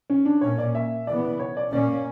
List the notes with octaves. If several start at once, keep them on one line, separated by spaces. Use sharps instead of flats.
C#4
D4
A#2 A#3 C#4 C#5
D5
E5
C#3 E3 B3 D5
C#5
D5
A#2 A#3 C#4 D5